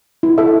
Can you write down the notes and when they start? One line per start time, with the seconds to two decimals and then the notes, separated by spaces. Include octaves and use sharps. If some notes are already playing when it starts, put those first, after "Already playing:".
0.23 E4
0.38 A4 E5